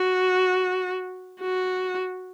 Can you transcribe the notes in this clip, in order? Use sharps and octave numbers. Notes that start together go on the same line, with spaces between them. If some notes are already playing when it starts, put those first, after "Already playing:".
Already playing: F#4
F#4